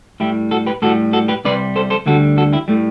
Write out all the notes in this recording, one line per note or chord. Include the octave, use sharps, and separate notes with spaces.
A2 G3 E4 G4
F#4 A4
G4 B4
A2 G3 F#4 A4
F#4 A4
G4 B4
C2 C3 G3 B4 D5
A4 C5
A4 C5
D2 D3 G3 F#4 A4
F#4 A4
E4 G4
A2 G3 A3